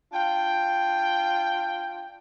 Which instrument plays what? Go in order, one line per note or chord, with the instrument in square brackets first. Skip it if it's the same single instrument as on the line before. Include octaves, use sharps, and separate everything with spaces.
[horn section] D4 F4 G5